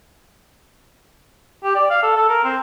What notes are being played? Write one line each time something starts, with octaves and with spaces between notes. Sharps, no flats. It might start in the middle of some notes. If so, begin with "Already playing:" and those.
G4
D5
F5
A4
A4
A#4
C4